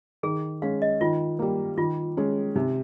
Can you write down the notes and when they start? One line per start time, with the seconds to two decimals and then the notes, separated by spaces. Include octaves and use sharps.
0.23 D#3 G#4
0.62 G#3 C#4 F5
0.82 D#5
1.01 D#3 F4
1.39 G3 A#3
1.77 D#3 F4
2.17 G#3 C#4
2.55 C3 D#4